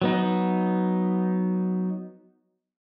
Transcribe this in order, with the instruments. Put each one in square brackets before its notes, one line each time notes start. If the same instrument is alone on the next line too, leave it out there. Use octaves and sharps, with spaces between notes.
[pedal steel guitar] F#3 B3 D#4